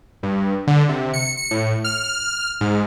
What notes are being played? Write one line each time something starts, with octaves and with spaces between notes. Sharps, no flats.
G2
D3
C3
C#7
C#7
A2
F6
G#2